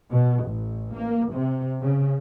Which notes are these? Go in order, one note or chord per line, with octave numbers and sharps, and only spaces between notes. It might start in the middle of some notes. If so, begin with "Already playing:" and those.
B2
A1
A#3
C3
C#3